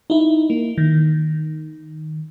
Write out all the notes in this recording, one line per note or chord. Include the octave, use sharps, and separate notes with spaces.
D#4 E4
A#3
D#3